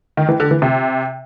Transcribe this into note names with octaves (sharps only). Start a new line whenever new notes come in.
D#3
E3
D3
E3
C3